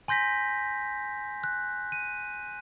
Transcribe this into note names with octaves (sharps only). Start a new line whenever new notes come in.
G#5 C6 G6 A#6 B6
F#6
D#7